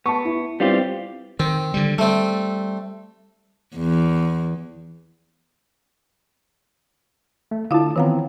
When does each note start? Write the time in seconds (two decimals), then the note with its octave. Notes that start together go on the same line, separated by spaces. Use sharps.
0.06 B3 A5 C#6
0.25 E4
0.60 G3 B3 C4 E4 F4 G4
1.40 D#3 C4
1.74 D3 G3
1.98 G3 A3 C4
3.76 E2
7.51 A3
7.71 D3 E4 F4 F5 A5
7.96 D#3 E3 B3 C4 F5 A#5